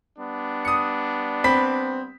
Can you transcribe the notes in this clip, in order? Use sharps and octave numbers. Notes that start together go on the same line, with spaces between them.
G3 B3 D4
D#6 C#7
C4 B5 B6